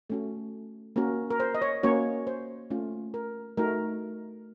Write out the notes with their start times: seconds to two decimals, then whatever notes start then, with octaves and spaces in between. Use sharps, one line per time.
0.10 A3 C#4 F#4 A4
0.96 A#3 C#4 F#4 A#4
1.30 A#4
1.40 C5
1.55 D#5
1.62 C#5
1.83 A#3 C#4 F#4 C#5
2.27 C5
2.70 A3 C#4 F4
3.14 A#4
3.57 A3 D#4 F#4 A#4